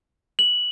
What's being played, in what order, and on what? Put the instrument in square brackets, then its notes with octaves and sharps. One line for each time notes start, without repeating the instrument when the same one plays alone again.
[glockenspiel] F#7